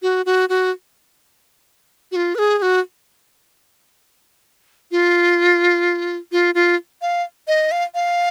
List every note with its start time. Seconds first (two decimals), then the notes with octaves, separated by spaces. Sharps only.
0.02 F#4
0.26 F#4
0.49 F#4
2.12 F#4
2.16 F4
2.35 B4
2.39 G#4
2.58 G#4
2.62 F#4
4.91 F4
6.32 F4
6.55 F4
7.02 F5
7.48 D#5
7.71 F5
7.94 F5